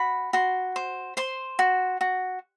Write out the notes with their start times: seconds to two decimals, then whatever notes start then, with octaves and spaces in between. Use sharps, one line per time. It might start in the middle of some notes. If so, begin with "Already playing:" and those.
Already playing: F#4 B5
0.33 F#4 C6
0.76 C5
1.17 C5 C6
1.59 F#4
2.01 F#4